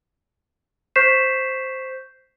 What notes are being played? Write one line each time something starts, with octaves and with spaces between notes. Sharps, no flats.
C5 C#6 G6 B6 C7 E7